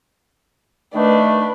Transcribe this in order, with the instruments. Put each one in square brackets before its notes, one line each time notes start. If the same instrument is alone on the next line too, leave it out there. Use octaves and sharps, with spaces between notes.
[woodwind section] D#3 A3 [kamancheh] D4 B4